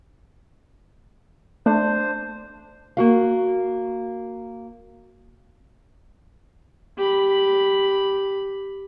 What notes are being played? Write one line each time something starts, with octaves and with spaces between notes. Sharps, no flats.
A3 D4 C5
A#3 F#4 F5
G4 B5